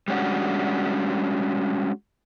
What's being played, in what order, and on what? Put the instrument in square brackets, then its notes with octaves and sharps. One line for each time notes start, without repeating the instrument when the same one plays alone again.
[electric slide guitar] G3 G#3 C#4 D4 F#4